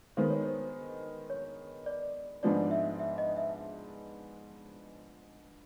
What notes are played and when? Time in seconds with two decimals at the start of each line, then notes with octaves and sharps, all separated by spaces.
0.17 D#3 G#3 B3 C5
0.30 C#5
0.43 C5
1.30 C#5
1.86 D5
2.43 G#2 F3 G#3 B3 D4 D5
2.71 E5
2.99 E5
3.18 D#5
3.37 E5